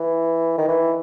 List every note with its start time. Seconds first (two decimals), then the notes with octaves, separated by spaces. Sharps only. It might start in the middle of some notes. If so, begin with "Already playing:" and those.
Already playing: E3
0.58 D#3
0.68 E3